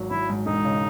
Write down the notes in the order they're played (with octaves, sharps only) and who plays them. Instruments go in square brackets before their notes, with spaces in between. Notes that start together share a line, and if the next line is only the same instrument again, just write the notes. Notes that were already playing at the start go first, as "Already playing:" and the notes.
Already playing: [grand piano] G#1 F#3
[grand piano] G#1 [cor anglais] E4
[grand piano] G#2
[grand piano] E1 [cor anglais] D#4
[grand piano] C#3